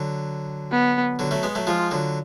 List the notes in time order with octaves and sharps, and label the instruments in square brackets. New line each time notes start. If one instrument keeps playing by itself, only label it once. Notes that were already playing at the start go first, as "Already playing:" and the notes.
Already playing: [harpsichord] D3 F#3
[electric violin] B3
[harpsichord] D3 F#3
F#3 A3
G#3 B3
F#3 A3
[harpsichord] F3 G#3 [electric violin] F4
[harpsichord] D3 F#3